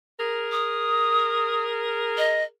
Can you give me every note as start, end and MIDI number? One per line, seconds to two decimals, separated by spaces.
0.20 2.50 68
0.20 2.50 70
0.52 1.64 87
2.18 2.43 75